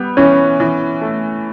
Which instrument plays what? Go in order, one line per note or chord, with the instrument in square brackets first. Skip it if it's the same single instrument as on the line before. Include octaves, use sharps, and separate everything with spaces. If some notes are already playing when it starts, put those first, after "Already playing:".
Already playing: [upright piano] G3 [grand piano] B3
[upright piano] E3 [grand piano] C#4
[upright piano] E3
A3